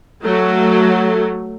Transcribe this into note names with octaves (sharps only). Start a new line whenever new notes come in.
F#3 A3